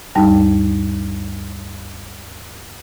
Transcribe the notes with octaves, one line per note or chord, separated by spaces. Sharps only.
D2 G2 G3 D#4 G5 A5